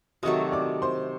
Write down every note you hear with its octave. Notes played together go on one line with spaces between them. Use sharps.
C3 D#3 F#3 A3 D#5 D#6
D5 D6
C5 C6